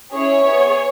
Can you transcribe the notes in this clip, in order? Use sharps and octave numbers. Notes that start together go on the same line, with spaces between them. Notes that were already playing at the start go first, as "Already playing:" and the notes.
C#4 E4 G#4 C#5
B3 G#4